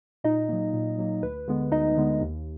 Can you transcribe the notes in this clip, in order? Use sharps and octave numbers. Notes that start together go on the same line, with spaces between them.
A#2 D#4 D#5
F#3 A#3
A#2
F#3 A#3
D2 B4
D3 G#3 B3
D2 D#4 D#5
D3 G#3 B3
D#2